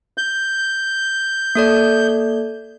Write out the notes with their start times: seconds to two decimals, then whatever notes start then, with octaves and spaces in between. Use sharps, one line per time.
0.18 G6
1.55 A#3 A4 D5